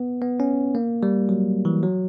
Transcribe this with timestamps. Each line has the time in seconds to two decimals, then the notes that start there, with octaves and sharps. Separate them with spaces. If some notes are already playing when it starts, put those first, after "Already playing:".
Already playing: B3
0.21 B3
0.40 C#4
0.75 A#3
1.03 G3
1.29 F#3
1.65 E3
1.83 F#3